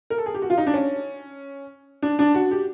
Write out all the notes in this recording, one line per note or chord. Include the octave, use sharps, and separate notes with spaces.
A#4
A4
G#4
G4
F#4
F4
D#4
D4
C#4
D4
D4
F#4
G4